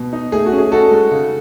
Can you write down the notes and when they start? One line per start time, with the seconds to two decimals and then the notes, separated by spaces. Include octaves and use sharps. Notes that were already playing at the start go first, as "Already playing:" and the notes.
Already playing: B2
0.13 D#4
0.32 A3 G#4
0.46 F#4
0.52 C#4
0.58 G#4
0.72 D#4 F#4 A4
0.91 G#3
1.11 C#3